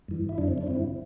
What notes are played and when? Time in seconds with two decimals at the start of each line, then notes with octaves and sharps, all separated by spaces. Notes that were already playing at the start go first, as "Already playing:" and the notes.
0.08 G2 E3
0.29 E4
0.38 F#2 D3 D4
0.48 C4
0.58 D4
0.67 G2 D3 C4 E4